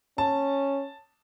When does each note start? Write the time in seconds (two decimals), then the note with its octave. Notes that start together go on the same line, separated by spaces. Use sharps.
0.18 C#4 A5